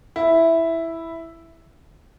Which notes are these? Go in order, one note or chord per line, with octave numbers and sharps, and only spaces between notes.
E4